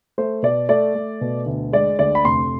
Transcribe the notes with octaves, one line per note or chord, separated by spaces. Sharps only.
A3 C5
B2 D5
A3 D5
A3
B2
D2
G#3 D5
D2 D5
B5
F1 C6